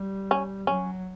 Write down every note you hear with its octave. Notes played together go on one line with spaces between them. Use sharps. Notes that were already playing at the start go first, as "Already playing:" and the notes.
Already playing: G3
C#4
F#3 C#4